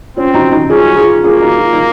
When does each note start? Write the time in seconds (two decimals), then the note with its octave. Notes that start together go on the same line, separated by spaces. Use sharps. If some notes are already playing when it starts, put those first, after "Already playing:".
0.17 C4 C#4 F4
0.34 D#4 F#4
0.52 D#4 F#4
0.70 C#4 F4 G#4
0.87 F#4
0.96 F4 G#4
1.24 A#3 F4 G#4
1.41 D#4 F#4
1.59 F4
1.73 D#4